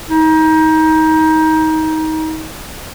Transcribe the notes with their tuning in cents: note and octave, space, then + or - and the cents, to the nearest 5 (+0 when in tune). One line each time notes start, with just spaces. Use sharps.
D#4 +25